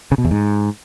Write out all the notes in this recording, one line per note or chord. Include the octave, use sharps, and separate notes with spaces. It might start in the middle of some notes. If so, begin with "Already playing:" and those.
C#3
B2
E2
G#2